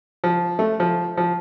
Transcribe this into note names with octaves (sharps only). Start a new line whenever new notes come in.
F3
A3
F3
F3